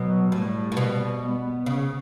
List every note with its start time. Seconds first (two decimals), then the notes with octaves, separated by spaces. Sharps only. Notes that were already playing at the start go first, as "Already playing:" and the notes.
Already playing: B2 F#3
0.32 A2 G3
0.72 A2
0.77 B2
1.21 B3
1.66 C#3